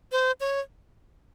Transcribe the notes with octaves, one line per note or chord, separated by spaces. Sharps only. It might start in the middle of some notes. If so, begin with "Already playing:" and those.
C5
C#5